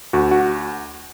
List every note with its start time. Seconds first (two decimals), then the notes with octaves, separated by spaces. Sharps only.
0.13 D2 F#4
0.31 F#4